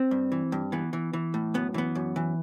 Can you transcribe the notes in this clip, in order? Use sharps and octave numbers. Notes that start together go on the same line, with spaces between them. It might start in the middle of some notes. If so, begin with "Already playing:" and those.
Already playing: C4
G2
E3
G2
E3 B3
E3
E3
A2
F#2 B3
E3 B3
F#2
E3